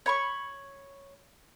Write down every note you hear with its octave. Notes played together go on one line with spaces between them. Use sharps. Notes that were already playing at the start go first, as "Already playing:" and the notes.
C#5 B5 C#6